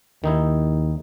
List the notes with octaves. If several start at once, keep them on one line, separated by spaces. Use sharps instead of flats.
D#2 D#3 D#4 E4